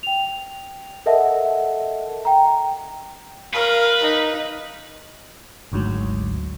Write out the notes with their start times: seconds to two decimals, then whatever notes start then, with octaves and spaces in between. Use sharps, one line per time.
0.03 G5 F7
1.06 A4 A#4 D#5 E5 F#5 A5
2.25 G5 A#5
3.54 A#4 B4 F5
4.01 D#4
5.72 G#1 D2 G#2 F#3